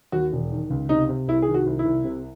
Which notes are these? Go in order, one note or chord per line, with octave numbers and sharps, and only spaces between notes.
D#2 F#4
E1
D#3
C#2
C3 D#4
C3
C2 E4
G#4
D#3
F#4
C2
E4
C2
C3